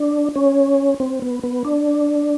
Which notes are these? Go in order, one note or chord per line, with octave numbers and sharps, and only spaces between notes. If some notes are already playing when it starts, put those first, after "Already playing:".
Already playing: D4
C#4
C4
B3
B3
D4